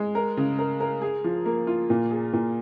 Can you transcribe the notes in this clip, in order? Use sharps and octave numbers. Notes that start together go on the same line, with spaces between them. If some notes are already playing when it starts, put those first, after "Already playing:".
Already playing: G#3
A#4
C#3
A#4
A#4
G#4
F3
A#3
F4
A#2
G#4
A#2